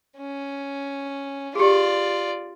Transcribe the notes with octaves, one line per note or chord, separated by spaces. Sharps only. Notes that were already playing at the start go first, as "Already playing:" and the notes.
C#4
F4 G4 G#4 D5